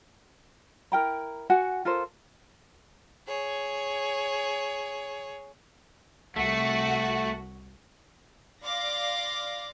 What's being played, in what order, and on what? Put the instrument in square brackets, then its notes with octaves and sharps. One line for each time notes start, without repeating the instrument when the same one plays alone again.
[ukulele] E4 A#4 G5 A#5
F#4 F#5 G#5
F4 A4 A#4 C5
[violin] G#4 C#5
[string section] C2 F#4 F#5 [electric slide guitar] A3
[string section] D5 F5 C6 D6 A#6